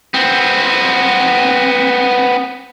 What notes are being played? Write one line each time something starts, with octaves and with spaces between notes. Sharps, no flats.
B3 C4